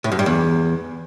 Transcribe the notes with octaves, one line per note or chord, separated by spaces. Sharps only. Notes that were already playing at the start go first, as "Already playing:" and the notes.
A2
F#2
G2
E2